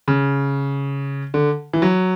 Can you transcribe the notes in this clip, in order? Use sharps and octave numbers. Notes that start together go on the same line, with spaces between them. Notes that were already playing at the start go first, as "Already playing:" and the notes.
C#3
D3
E3
F#3